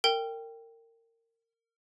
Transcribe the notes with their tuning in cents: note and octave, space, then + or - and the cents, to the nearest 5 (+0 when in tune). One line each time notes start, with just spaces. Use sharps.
A#4 -30 G5 +0